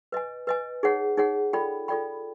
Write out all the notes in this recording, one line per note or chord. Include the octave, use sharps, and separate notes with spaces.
B4 D#5 G#5
B4 D#5 G#5
D#4 G#4 C#5 F#5
D#4 G#4 C#5 F#5
F4 A4 D5 G5 B5
F4 A4 D5 G5 B5